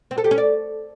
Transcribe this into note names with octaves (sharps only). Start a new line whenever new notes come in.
C4
A4
G4
C#4
D5